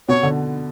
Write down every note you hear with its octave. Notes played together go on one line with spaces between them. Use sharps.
B2 C#5
D3